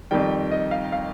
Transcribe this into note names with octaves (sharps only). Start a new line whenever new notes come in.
F2 D#3 G3 G5
G5
D#5
F5
F5